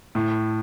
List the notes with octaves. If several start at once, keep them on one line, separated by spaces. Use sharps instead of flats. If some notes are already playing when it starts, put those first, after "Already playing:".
A2